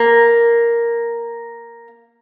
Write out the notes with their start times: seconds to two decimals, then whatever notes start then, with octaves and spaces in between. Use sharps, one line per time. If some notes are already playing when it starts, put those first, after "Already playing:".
Already playing: A#3